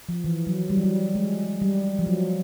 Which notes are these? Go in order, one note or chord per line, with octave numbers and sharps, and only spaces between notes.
F3
E3
F#3
G3
F#3
G3
G#3
G3
F3
F#3